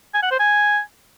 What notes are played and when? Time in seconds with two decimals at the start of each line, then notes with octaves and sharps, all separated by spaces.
0.14 G#5
0.22 F#5
0.31 C5
0.39 G#5